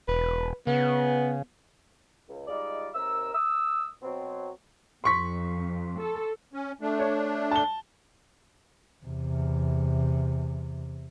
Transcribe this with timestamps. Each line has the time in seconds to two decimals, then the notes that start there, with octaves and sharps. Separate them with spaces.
0.08 E1 B4
0.67 C#3 B3
2.29 C#2
2.48 G3 G#3 D#4 F4 D5
2.95 D#2 C3 A#4 E6
3.34 D#6 E6
4.02 B2 F#3 C4
5.04 F2 C6 C#6 B6
5.97 A4
6.53 C#4
6.81 A3 D4
6.99 C#5
7.51 A5 G7
9.05 E2 C3